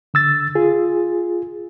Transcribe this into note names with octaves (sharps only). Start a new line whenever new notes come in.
D3 E6 A6
F4 G#4